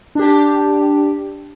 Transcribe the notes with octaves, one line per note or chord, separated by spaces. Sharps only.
D4 G4